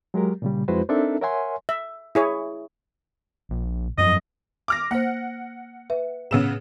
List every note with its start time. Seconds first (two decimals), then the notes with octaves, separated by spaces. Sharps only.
0.14 F#3 G#3 G4 A#4
0.42 A#2 C#3 G3
0.68 F2 G#3 E4 F#4 B4 C5
0.89 C4 D4 D#4 A4 A#4 E5
1.21 A#4 C#5 E5 F#5 G#5 C6
1.69 E5
2.15 E4 G#4 C#5
3.51 A#1
3.98 F#2 F3 F#3 D#5
4.68 D6 F6 A#6
4.91 A#3 C5 F#5
5.90 B4 E5
6.31 A2 C#3 B3 E6 E7